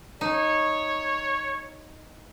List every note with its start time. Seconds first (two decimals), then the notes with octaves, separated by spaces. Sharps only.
0.21 D#4 C#5